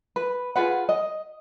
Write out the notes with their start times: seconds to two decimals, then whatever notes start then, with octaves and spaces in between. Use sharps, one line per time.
0.16 B4
0.56 F4 G#4 B4 F#5
0.89 D#5